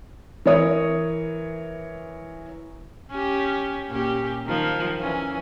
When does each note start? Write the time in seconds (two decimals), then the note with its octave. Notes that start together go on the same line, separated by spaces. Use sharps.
0.46 E3 A#4 C#5 D#6
3.11 C#4 G4
3.88 A#2 C#4 G4
4.47 D#3 F3
4.99 E3 C#4